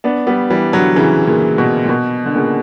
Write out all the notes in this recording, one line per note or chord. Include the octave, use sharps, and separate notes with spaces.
B3 D4
G3 B3
E3 G3
D3 F#3
C#3 E3
A#2 C#3
B2
A#2
B2
D3
A#2 C#3